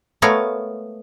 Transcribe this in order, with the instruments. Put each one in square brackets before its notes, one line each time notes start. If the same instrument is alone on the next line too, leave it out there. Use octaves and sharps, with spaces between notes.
[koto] G#3 A3 B3 A#4 C#5 F5